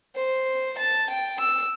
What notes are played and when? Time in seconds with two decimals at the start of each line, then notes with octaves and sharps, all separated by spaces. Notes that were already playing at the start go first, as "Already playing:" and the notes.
0.15 C5
0.77 A5
1.09 G5
1.40 E6